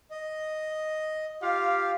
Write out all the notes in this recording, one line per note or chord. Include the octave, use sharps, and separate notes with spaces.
D#5
F4 G4 F5